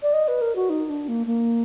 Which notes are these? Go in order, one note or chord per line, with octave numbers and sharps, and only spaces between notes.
D5
D#5
B4
A#4
F#4
D#4
D4
A#3
A#3